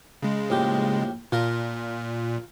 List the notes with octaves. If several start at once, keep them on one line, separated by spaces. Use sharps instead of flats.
C#3 G#3
A#1 A2 G4
A#2 F4 A#4 A5